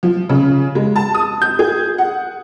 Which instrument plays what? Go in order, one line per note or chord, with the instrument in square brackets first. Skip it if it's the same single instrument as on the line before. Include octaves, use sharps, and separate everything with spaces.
[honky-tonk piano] F3
C#3
G#3
A5
D#6
G6
G#4
F#5